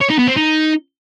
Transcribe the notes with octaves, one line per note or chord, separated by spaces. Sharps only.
C#5
D#4
B3
C4
D#4